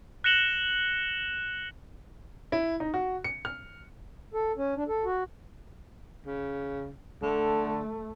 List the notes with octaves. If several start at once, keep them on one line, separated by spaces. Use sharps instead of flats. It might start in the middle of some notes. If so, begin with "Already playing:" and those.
F#6 A#6 C#7 E7 F#7 G7
E4
D#4
F#4
C#7
F6
A4
C#4
D4
A4
F#4
C#3
D3 A3